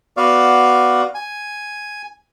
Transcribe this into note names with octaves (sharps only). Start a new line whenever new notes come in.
B3 F#4 D5 F5
G#5